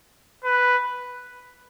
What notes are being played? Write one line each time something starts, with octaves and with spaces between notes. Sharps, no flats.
B4